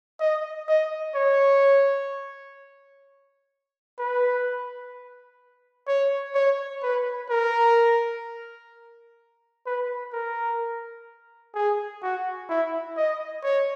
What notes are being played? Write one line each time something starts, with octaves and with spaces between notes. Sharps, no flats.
D#5
D#5
C#5
B4
C#5
C#5
B4
A#4
B4
A#4
G#4
F#4
E4
D#5
C#5